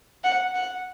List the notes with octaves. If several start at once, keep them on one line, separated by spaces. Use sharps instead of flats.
F#5
F#5